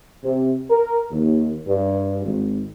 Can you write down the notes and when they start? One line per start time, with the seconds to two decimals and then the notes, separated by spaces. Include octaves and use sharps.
0.24 C3
0.69 A#4
1.11 D#2
1.67 G2
2.24 G#1